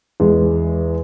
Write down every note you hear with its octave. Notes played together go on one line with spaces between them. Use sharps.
E2 G#3